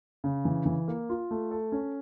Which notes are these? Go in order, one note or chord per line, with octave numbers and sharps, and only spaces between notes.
C#3
E3
E3
A#3
F4
A3
A4
C#4